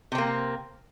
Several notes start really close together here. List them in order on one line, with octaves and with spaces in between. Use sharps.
C3 C4 A#3